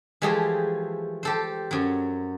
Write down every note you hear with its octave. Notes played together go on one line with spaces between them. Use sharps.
E3 F3 G#3 A3 G4 G#4
G4 A4 C5
F#2 F#3